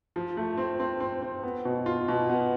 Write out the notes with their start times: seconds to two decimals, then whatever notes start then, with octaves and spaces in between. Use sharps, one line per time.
0.16 F3
0.37 A3
0.57 C4
0.80 C4
1.00 C4
1.22 C4
1.43 B3
1.65 B2
1.86 F4
2.08 B2
2.30 B3